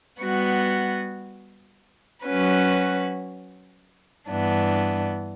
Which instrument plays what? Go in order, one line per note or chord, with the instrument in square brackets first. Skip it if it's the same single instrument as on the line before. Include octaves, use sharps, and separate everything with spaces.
[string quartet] G3 B3 F#4
F#3 C#4 F#4 B4
G2 E3 B3 D4